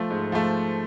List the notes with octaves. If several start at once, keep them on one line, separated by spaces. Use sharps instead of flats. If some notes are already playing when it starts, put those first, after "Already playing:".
Already playing: F3 A3
G#2
F3 A3